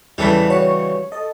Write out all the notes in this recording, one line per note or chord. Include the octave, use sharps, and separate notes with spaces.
E2 C#3 E3 G3 E4 A4 A5 B6
F#4 C#5 C#6
A4 D#5